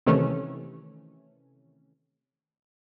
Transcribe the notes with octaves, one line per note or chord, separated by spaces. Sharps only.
C3 D#3 E3 A3 C#4